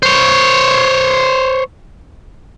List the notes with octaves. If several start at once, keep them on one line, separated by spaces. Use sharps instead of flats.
C5 C#5